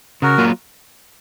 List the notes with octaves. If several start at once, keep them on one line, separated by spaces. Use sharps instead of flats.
C#3 F#4 A#4
F#3 A#3 F4